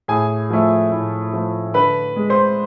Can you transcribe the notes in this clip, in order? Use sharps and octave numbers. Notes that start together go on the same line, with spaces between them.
A2 G#4 G#5
F3 A3
A2
F3 A3
D3 B4 B5
G#3
C5 C6